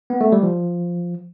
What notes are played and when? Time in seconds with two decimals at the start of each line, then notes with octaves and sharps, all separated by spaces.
0.10 B3
0.21 A3
0.32 G3
0.43 F3